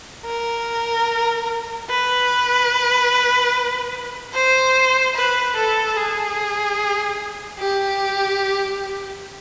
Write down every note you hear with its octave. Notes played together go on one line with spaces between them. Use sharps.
A#4
B4
C5
B4
A4
G#4
G4